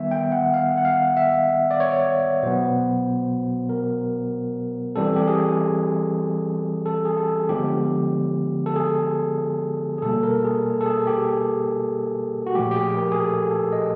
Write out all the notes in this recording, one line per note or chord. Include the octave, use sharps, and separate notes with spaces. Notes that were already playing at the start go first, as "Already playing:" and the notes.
Already playing: D#3 G3 B3 E5
G5
F#5
F5
F#5
F5
E5
D5
C#5
B2 F#3 B3 C5
A#4
E3 G3 C4 A4
G4
G#4
A4
G#4
A4
D3 F3 G#3 B3 G4
A4
G#4
G#4
B2 G3 A#3 A4
A#4
G#4
A4
G#4
G4
F#4
A#2 F3 A3 G4
G4
G#4
A#4
G#4
A4
A4
D#5